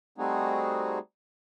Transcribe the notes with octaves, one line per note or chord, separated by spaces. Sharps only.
G3 A3 C4 D#4 F#4 G#4